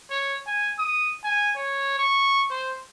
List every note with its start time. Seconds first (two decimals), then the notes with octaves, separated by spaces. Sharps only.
0.10 C#5
0.47 G#5
0.79 D#6
1.24 G#5
1.56 C#5
1.99 C#6
2.50 C5